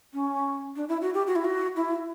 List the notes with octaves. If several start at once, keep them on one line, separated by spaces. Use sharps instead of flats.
C#4
D4
E4
F#4
G4
F#4
E4
F#4
E4